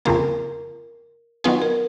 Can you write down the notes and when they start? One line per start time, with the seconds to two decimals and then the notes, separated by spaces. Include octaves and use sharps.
0.05 F2 C#3 F3 A#3 A#4
1.44 D#3 F#3 B3 F4 G#4 B4
1.62 A#4